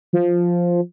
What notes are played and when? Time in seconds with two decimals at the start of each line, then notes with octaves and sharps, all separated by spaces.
0.13 F3